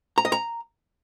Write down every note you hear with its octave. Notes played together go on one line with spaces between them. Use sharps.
A#5
D#5
A#5